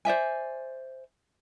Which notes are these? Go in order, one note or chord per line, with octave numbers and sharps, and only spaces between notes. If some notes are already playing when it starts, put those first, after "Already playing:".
C5 D5 E5 G#5